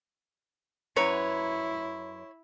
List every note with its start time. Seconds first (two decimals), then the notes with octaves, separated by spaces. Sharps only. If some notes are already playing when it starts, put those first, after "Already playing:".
0.97 F#2 E4 B4 C#5 A#5